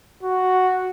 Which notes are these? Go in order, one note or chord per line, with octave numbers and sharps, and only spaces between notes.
F#4